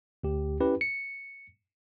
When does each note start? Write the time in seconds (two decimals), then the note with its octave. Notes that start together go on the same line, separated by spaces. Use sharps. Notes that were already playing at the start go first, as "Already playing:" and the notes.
0.23 D2 G4
0.60 C#4 E4 G4 B4
0.81 C#7